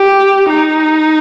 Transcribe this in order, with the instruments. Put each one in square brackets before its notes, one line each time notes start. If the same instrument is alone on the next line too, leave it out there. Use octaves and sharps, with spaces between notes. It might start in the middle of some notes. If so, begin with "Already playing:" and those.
Already playing: [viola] G4
D#4